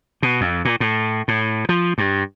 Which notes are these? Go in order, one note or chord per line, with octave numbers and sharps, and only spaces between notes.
B2
F2
A#2
A2
A2
F3
G2